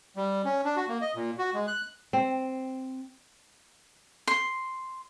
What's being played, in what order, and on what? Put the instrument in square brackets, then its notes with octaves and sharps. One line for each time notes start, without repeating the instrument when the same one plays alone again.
[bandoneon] G3
C#4
D4
F#4
A#3
D#5
A#2
F#4
G#3
F#6
[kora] C4
[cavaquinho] C6